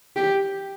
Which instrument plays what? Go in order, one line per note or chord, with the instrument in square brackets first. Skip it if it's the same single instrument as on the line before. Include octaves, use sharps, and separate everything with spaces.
[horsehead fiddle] G4